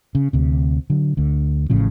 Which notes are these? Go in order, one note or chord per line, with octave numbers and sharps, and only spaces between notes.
C#3
D2 C3
D3 F#3
D2 D3
A1 A2 C#3 F3